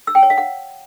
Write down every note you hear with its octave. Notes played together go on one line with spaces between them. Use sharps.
E6
G5
C#5
F5
F#5